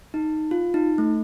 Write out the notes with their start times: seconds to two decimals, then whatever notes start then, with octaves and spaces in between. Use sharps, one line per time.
0.14 D#4
0.51 F4
0.74 D#4
0.98 A3